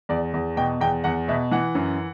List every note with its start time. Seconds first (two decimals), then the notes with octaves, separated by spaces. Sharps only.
0.09 E2 D5
0.34 E2
0.57 B2 G5
0.80 E2 G5
1.04 E2 F#5
1.28 B2 E5
1.51 E3 F#5
1.75 F#2